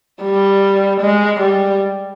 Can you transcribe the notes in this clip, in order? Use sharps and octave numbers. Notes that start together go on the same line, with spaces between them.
G3
G#3
G3